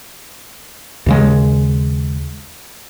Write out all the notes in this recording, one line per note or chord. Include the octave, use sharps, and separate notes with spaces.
D#2 C#3 G#3